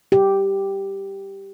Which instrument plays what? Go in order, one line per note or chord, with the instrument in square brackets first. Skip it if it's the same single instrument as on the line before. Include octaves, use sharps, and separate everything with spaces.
[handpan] G4